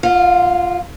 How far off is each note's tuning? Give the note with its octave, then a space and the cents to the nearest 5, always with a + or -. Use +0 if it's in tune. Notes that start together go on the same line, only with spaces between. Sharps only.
F4 -5 F#5 -45